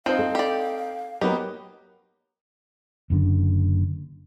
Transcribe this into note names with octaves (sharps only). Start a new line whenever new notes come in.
F3 C4 D#4 C5 F5
A4
G4 D5
F#3 A#3 B3 D#4 G4
F#1 F#2 D3